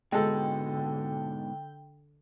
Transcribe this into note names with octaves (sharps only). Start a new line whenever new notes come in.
G#2 B2 D3 G#3 A4 G5